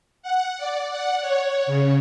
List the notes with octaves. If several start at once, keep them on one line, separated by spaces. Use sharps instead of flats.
F#5
D5
F#5
C#5
C#3